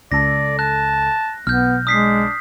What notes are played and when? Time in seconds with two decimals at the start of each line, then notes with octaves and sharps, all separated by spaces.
0.12 C#2 A4 D5 A#6
0.59 A5 F#6
1.47 B1 B3 F6 G6
1.87 G#3 D4 D#6 B6 C7